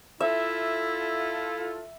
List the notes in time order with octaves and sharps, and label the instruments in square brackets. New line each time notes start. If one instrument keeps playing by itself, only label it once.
[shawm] E4 [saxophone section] F4 A4 [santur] E5